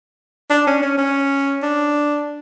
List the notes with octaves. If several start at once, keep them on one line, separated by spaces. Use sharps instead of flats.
D4
C#4
C#4
C#4
D4